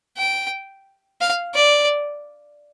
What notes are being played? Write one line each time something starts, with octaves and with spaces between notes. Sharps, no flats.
G5
F5
D5